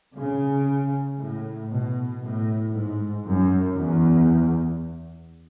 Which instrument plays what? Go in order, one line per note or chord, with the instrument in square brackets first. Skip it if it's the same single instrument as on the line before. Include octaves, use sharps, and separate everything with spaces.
[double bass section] C#3
A2
B2
A2
G#2
F#2
E2